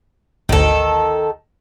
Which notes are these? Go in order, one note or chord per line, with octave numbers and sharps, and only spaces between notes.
G#1 D2 D#3 A4